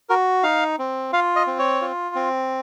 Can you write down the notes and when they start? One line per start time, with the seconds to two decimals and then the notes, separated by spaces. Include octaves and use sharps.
0.09 F#4 A#4
0.43 D#4 F5
0.79 C4
1.13 F4 F5
1.36 D#5
1.47 C4
1.59 C#5
1.81 F4
2.15 C4